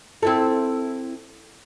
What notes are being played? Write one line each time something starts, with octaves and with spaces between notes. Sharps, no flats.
C4 E4 A4